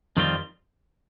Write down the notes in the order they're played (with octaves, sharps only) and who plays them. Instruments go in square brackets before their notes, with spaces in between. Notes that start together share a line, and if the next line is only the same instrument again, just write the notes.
[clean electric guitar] F2 D#3 G3 C4 F4